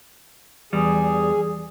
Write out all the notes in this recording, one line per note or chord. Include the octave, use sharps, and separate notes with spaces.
E2 G3 G#4